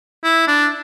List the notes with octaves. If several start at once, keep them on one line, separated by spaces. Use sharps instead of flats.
E4
D4